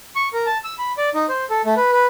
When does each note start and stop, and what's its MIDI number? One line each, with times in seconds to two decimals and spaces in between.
0.16 0.29 85
0.33 0.46 70
0.46 0.58 81
0.64 0.75 88
0.78 0.92 83
0.98 1.09 74
1.15 1.26 63
1.29 1.44 72
1.50 1.62 69
1.65 1.74 57
1.77 1.92 71
1.92 2.06 71